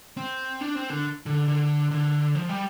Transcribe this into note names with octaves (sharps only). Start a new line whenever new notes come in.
C4
D4
C4
D3
D3
D3
D3
F3
G3